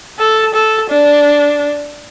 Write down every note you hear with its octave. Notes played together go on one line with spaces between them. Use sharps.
A4
A4
D4